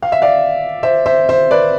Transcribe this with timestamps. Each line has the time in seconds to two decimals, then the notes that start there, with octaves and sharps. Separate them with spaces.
0.02 F5
0.12 E5
0.22 D5 F5
0.83 C5 E5
1.06 C5 E5
1.29 C5 E5
1.51 B4 D5